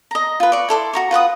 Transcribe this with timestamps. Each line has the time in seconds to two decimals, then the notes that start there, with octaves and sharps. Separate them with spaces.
0.11 D#5 A#5
0.40 F4 B4
0.52 D5 C#6
0.69 E4 A4 C6 D6
0.93 F#4 A#5 C#6
1.11 F4 B4 F#5 D#6